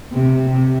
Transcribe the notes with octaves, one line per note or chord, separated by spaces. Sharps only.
C3
C3